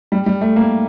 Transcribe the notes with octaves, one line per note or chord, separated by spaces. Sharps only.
G3
G3
A3
A#3